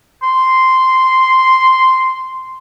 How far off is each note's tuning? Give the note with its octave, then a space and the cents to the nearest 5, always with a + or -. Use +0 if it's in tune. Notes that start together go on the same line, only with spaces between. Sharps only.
C6 -5